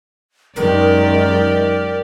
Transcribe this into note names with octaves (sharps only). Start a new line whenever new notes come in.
F#2 D#3 G#3 G4 A#4 D5